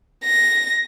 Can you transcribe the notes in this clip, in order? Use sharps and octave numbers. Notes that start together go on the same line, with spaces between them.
A#6